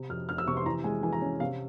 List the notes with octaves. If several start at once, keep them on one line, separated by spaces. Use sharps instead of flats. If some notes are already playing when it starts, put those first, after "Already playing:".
Already playing: C3
F2 F6
F1 F6
E6
C3 C#6
C6
E3 A#5
G#3 G#5
E3 G#5
A#5
C#4
C3 F5